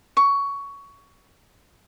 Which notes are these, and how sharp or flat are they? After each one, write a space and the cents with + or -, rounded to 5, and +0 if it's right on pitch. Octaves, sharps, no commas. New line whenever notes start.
C#6 +15